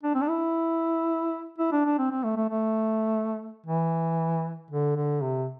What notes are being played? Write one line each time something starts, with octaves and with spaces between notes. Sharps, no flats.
D4
C4
D4
E4
E4
D4
D4
C4
C4
A3
A3
A3
E3
D3
D3
C3